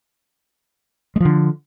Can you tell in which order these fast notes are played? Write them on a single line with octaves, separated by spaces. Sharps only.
G#3 F3 D3